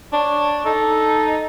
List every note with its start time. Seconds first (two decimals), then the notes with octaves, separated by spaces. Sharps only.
0.13 D4 C#5
0.65 D#4 A4